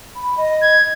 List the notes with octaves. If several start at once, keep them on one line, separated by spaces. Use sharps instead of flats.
B5
D#5
G#6